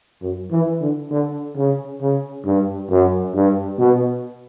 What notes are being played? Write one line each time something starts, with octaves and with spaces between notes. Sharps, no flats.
F#2
E3
D3
D3
C#3
C#3
G2
F#2
G2
B2